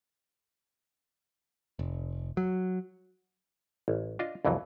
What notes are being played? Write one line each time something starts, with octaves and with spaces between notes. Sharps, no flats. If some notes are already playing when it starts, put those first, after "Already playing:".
F1
F#3
A1
D4 F4 D#5
C2 F2 E3 F#3